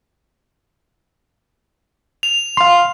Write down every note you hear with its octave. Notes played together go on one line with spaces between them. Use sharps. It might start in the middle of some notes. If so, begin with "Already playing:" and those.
F7
F5 C6